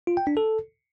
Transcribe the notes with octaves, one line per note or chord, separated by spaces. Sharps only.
F4
G5
D4
A4